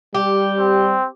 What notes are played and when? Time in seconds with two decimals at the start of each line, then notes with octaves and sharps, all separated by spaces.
0.15 G3 G4
0.59 C4